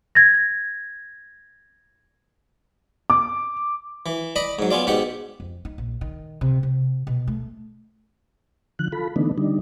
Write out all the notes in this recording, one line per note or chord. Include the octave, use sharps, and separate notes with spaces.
G#6 A#6
D6
E3
D5 D#5 B5
G#2 F#3
B3 C#4 F4 D5
G#2 B2 G4 F#5
F2
D#4
A#1
D#3
C3
C3
B2
A3
D3 F3 F#6
F4 A4 B5
D3 E3 A3 B3 D4 D#4
D3 G3 D4 D#4